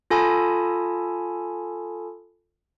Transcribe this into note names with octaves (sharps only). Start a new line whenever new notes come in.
F4 A4 G#5 A5 B5 D#6